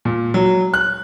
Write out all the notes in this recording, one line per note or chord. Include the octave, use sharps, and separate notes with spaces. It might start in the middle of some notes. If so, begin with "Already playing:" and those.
A#2
F#3
F#6